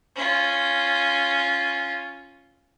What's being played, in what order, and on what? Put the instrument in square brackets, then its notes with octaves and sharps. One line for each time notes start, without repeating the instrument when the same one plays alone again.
[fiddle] C#4 F4